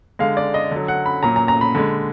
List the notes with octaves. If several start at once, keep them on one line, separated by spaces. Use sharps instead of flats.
D3 G#3 F5
D5
D#5
D3 F#3
F#5
B5
A#2 F#3 A#5
A#5
A#5
B5
D3 G#3